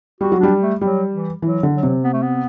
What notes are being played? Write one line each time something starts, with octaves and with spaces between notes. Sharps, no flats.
G3 F#4
F#3
G3 D4
A3
F#3 G3
E3
E3 F#3
D3
F#3
C3
B3
A3
B3